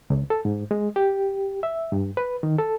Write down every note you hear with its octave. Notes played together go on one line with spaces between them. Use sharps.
C#2
A4
G#2
G#3
G4
E5
G2
B4
D#3
A4